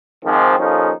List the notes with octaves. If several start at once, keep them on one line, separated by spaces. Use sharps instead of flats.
G#2 D#3 F3 C4
D#2 F3 C#4 D#4 A4